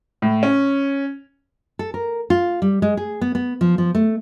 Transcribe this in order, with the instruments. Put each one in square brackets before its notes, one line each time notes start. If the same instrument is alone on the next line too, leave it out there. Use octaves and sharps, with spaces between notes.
[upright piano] A2
C#4
[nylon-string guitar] A4
A#4
F4
G3
G#3
G#4
B3
B3
F3
F3
A3